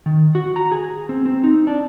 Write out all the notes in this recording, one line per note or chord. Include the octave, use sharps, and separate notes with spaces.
D#3
F#4
A#5
G#4
C4
C4
D#4
D4